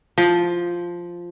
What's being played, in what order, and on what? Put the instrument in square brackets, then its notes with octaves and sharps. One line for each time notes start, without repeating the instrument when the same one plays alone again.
[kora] F3